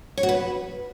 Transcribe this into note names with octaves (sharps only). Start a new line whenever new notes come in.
C#5
F#4
B4